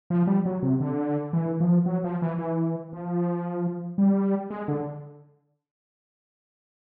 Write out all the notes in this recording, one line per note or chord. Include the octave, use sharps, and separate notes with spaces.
F3
G3
F#3
C3
D3
E3
F3
F#3
F3
E3
E3
F3
G3
G#3
D3